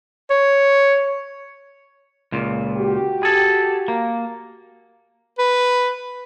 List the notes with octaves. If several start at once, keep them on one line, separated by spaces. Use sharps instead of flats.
C#5
C#2 A#2
F#4 G4
G#4 A4
A#3
B4